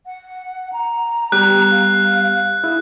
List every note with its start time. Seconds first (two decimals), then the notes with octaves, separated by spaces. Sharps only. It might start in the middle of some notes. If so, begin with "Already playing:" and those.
0.06 F#5
0.73 A#5
1.32 G3 B3 G4 F#6
1.71 F5
2.64 E4 G#4